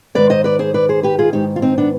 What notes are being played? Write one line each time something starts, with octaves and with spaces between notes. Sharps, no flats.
G#2 D#3 B4 D5
C5 D#5
B4 D5
G#4 C5
B4 D5
G#4 C5
G4 B4
F4 G#4
G#2 D#3 D#4 G4
F4
C4 D#4
B3 D4